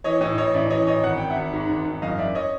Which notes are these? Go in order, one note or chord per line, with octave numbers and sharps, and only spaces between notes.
E3 C#5 D#5
A2 C#5 D#5
A1 C#5 D#5
A1 D5 E5
E3 C#5 D#5
A1 C#5 D#5
G#1 F#5
G#1 G5
E5 F#5
G#1
G#2
G#1
G#1
F#1 D#5 F5
F#1 D5 E5
C#5 D#5